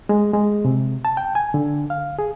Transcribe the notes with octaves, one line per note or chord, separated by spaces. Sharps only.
G#3
G#3
C3
A5
G5
G#5
D3
F5
G#4